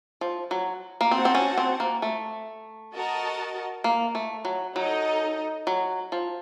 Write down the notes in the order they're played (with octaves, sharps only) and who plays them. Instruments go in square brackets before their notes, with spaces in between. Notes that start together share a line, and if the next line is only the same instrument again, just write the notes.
[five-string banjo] F3
F#3
A#3
[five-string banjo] C4 [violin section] F#4 C5 F#5 A5
[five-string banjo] C4
C#4
C4
A#3
A3
[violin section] F#4 A#4 D#5 A5
[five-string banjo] A#3
A3
F#3
[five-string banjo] F#3 [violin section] D#4 A4 D#5
[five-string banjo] F#3
F3